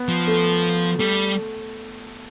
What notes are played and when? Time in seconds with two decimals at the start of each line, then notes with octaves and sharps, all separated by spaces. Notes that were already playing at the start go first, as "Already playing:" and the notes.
Already playing: B3
0.09 F3
0.27 A3
0.99 G3 A3